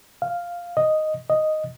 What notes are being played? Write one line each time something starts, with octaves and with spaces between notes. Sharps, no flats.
F5
D#5
D#5